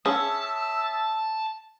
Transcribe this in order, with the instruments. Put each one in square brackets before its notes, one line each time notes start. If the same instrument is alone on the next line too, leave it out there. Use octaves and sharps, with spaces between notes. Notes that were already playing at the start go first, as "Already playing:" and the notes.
[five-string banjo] C#4 [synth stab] G#4 [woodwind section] E5 D#6 E6 [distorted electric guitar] A5